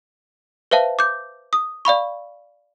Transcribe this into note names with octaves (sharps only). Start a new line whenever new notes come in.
B4 C5 E5 F5 A5
D6 G6
D#6
D5 F5 B5 C#6